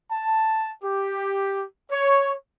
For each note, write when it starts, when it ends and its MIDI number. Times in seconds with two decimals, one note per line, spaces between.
0.11 0.71 81
0.84 1.65 67
1.92 2.34 73